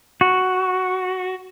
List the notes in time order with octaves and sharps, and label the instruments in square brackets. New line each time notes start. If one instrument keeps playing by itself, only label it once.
[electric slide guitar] F#4